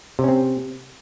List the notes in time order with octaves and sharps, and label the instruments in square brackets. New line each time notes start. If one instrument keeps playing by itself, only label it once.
[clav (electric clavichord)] C3
C#4
C4